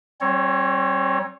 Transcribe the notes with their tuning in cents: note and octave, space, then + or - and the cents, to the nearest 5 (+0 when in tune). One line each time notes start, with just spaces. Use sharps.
G3 -40 C4 +35 C#5 +0